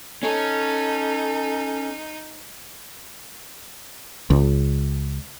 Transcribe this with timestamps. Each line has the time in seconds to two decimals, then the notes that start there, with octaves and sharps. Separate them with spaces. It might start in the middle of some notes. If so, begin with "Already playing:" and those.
0.23 C#4 D#4 A4
4.30 C#2